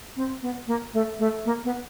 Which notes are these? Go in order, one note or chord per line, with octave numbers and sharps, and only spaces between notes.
C4
B3
A#3
A3
A3
A#3
B3